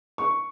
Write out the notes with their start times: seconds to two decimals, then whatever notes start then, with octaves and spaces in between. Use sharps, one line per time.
0.18 C#6